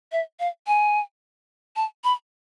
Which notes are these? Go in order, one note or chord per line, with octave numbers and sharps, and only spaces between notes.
E5
F5
G#5
A5
B5